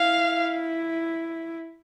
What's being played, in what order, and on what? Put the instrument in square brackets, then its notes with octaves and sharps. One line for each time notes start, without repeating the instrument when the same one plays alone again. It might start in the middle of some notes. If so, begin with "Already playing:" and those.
Already playing: [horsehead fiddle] E4 [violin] F5